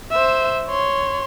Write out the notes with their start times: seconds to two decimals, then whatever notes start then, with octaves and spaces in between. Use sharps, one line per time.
0.12 C5 E5
0.68 C#5 C6